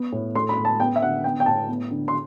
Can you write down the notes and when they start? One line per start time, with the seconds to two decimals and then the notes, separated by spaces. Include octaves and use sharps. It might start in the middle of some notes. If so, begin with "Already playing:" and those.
Already playing: B3
0.12 A2
0.35 A3 C6
0.49 B5
0.58 A2
0.65 A5
0.80 B3 G5
0.96 E5
1.02 D3 F#5
1.24 B3 G5
1.40 G5
1.46 A2 A5
1.68 B3
1.91 D3
2.08 C6